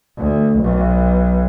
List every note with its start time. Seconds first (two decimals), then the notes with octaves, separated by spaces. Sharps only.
0.18 D2
0.59 B1